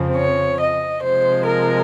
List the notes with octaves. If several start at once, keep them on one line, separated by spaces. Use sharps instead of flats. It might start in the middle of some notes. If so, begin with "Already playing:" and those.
Already playing: F2 C#3 F3 C4
C#5
D#5
C3 F3 G#3 C5
A#4